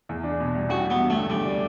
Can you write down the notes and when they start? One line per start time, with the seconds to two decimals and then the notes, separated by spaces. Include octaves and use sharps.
0.09 E2
0.24 D4
0.40 B2
0.55 G3
0.69 A1 F#4
0.84 G3
0.90 B3
0.99 G2
1.10 A3
1.15 D3
1.30 D2 G3
1.46 D4